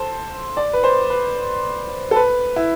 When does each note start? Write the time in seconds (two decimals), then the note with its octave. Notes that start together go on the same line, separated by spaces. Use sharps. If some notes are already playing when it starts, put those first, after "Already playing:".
Already playing: A4 C5
0.57 D5
0.73 B4
0.84 C5
1.10 B4
2.11 A4
2.16 B4
2.56 E4